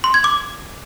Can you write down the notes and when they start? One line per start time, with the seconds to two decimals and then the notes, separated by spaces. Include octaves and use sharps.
0.04 C6
0.14 G#6
0.24 D6